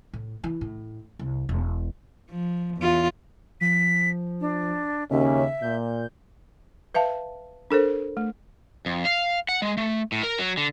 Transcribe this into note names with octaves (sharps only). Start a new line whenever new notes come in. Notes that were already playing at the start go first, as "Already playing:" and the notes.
A2
E3
A2
C2
E1
F3
E2 F4
F3 B6
D4
D#2 C#3 C#4 E5
A#2 G6
B4 E5 F5 A5
D4 A4 A#4 C5
A3
F2
F5
F#5
G#3
A3
A2
A#4
F#3
D3